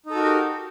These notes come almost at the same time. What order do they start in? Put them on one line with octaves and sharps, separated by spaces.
D#4 A4 F#4 A#4 G4